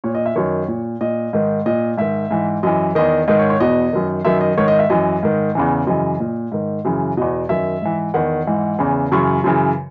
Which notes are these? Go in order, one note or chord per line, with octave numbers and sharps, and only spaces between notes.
A#2 C#5
D#5
E5
F#2 D#3 C#5
A#2
A#2 D#5
G#2 D#3
A#2 D#5
G#2 D#3 E5
G#2 E3
F#2 E3 D#5
E2 D#3 D#5
G#2 D#3 D#5
C#5
C#5
E2 B2 D#5
F#2 D#3
F#2 D#3 E5
D#5
G#2 D#3 C#5
D#5
E5
F#2 E3 D#5
G#2 D#3
E2 C#3 E3
F#2 C#3 E3 D#5
A#2
G#2 D#3
F#2 C#3 E3
E2 B2 D#5
F#2 D#3 E5
G#2 E3
E2 D#3 F#5
G#2 E3
E2 C#3 E3
F#2 C#3 E3 C#6
F#2 C#3 E3